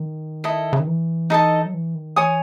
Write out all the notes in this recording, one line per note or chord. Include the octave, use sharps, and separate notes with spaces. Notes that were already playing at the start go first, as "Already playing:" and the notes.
Already playing: D#3
E4 A4 D#5
C#3
D#3
E3
D#4 A4 D#5 A5
F#3
E3
D#3
E3 C#5 G#5 D#6